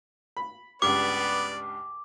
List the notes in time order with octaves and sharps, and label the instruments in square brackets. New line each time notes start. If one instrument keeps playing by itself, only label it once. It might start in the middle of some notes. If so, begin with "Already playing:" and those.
[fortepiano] B5
[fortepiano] C#2 G2 [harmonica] B3 D5 [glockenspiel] D6